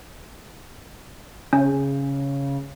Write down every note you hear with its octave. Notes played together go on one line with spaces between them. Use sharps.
C#3 C#4